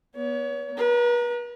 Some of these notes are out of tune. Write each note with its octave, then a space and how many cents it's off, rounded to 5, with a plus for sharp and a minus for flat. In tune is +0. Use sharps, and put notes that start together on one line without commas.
B3 -20 C#5 +35
B4 -40 A#5 +0